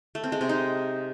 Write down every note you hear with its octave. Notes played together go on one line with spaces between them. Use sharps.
A3
C4
G#3
C3
D#4